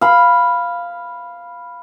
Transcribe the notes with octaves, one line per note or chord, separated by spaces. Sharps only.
F5 B5